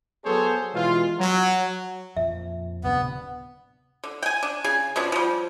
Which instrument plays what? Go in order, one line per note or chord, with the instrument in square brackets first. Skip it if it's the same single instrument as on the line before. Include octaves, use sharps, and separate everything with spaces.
[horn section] F#3 B3 G#4 A4 C5 C#5
B2 E3 G#3 F4
F#3
[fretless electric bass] F2 A#2 F3 [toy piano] E5
[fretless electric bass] D1 C3 D4 [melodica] B3
[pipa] D3
G5 G#5
D4
C#3 G#4 G#5
B2 F3 C#4 D4
F3 G3